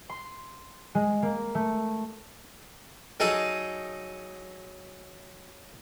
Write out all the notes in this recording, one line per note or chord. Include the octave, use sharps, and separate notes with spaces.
C6
G#3
A#3
A3
F#3 D#4 G#4 A4 D#5 F5